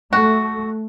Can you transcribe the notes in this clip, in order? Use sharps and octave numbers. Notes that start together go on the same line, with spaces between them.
A3 F#4